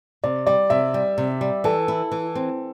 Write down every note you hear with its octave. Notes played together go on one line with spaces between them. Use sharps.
C3 D5
G3 D5
C3 E5
G3
C3
G3
E3 A4
E4
E3
C4